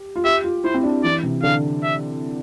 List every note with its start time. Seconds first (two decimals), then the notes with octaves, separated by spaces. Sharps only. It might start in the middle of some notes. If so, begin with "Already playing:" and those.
Already playing: G4
0.16 F4
0.24 G4 E5
0.44 F4
0.64 E4 C5
0.74 C4
0.84 D4
1.04 E3 D5
1.23 C3
1.43 D3 F5
1.83 E5